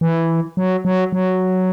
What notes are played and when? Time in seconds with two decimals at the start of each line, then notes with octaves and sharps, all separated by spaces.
0.01 E3
0.57 F#3
0.85 F#3
1.12 F#3